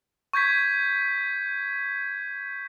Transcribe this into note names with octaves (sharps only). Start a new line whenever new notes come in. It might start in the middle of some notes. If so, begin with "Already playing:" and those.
C#6 G6 G#6 B6